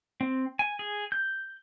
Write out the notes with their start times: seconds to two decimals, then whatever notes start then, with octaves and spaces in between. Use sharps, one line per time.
0.21 C4
0.59 G#5
0.79 G#4
1.12 G6